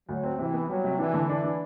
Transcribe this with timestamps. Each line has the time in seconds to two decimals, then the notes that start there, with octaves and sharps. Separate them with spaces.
0.09 D2 F#3
0.23 C4
0.38 C3 E3
0.54 B3
0.69 F#3 G3
0.84 C3
0.98 E3 D4
1.14 D3
1.28 E3 D4
1.44 D4